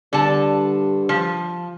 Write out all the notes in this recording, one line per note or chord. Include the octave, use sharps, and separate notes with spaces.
G2 D3 A5
F3